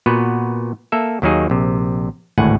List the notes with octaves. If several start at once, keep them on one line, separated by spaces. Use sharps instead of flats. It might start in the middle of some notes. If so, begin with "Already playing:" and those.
A#2 B3 F#4 B4
A#3 A4 E5
D#2 D#3 F#3 A#3 D#4 G#4
A#1 C3
G#1 D2 A2 F#5 G#5